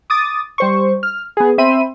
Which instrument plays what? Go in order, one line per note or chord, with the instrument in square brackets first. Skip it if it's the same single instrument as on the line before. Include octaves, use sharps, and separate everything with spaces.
[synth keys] D6 D#6 A6
G3 C5 C#6
F6
B3 G#4
C4 E5 B5 C6 D#7